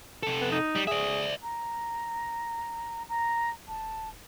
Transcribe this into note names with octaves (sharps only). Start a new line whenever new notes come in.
C3 A4
B3
D#4
G3
G#4 D5 E5
A#5
A#5
D#1 A5